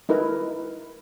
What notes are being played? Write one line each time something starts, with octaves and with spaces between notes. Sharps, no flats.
D#4 E4 A#4 B4